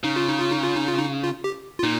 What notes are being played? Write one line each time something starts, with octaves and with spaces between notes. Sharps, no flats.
C#3 D#4
F4
D#4
F4
D#4
F4
D#4
F4
D#4
F4
G4
F4
A#2 D#4